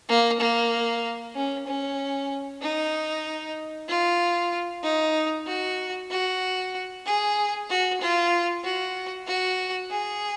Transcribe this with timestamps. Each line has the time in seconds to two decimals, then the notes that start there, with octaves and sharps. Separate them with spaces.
0.09 A#3
0.40 A#3
1.35 C#4
1.67 C#4
2.62 D#4
3.88 F4
4.83 D#4
5.47 F#4
6.11 F#4
7.06 G#4
7.70 F#4
8.01 F4
8.64 F#4
9.27 F#4
9.91 G#4